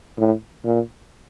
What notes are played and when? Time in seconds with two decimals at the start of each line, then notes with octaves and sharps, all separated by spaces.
0.17 A2
0.65 A#2